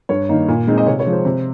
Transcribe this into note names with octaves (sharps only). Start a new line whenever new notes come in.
G2 C#5
D#3 A#3 D#4
A#2
G#3 C4 D#4
D#5
C3 C#5
C#5
F3 G#3
C5
C3